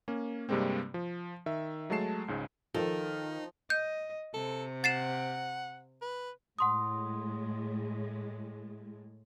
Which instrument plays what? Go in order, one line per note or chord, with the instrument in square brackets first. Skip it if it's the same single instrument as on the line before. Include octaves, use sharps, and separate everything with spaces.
[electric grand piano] A#3 C#4
G2 C3 G3 G#3 A#3 C4
F3
D#3 E5
F#3 G#3 A3 A5 C7 E7
C#2 G#2 C#3
[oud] D#3 [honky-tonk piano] F3 [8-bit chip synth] D#4 [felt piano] A4
[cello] D#5 [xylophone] G6
[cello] C3 [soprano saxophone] A4
[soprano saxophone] F#5 [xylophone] A6 C7 E7
[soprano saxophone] B4
[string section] A2 G#3 [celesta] F#5 C6 D#6